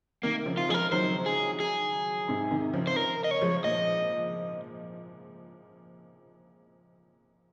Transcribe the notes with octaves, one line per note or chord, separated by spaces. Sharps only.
C3 D#3 A#3
C#3 F3
F4
F3 G#3 G#4
A#4
D#3 F#3 C5
G#4
G#4
G#2 C3
C3 D#3
C#3 F3
C5
A#4
D#5
C#5
F3 G#3
A#2 D#5